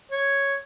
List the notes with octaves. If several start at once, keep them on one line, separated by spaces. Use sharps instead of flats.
C#5